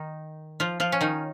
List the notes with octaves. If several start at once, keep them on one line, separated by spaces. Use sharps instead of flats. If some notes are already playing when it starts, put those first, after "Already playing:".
Already playing: D#3 D#4
F3 F4
F3 F4
C#4
D#3 D#4